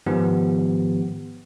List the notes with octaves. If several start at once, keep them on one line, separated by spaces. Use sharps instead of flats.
G#2 D#3 F3 B3 G4